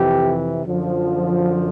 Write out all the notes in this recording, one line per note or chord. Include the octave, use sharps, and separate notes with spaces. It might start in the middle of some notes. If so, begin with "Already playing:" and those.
Already playing: F2 C3 E3 G4
F#2 D3 F3